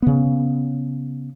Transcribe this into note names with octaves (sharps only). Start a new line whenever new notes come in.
C#3 B3